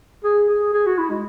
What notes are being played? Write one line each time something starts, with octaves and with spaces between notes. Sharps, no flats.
G#4
G#4
G#4
F#4
E4
G#3